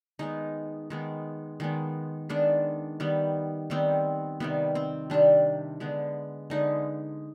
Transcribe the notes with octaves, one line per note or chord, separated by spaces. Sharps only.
D#3 G#3 B3 D#4
D#3 G#3 B3
D#3 G#3 B3
D#3 G#3 B3 D4
D#3 G3 B3
D#3 G3 B3 C4
C3 D#3 G3 B3
C4
C3 D#3 G3 D4
D3 G#3 B3
D3 G#3 B3 D#4